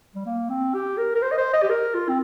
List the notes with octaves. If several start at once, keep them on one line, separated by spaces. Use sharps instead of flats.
G3
A#3
C4
G4
A#4
A#4
C5
D#5
C5
D#5
G4
A#4
F4
C4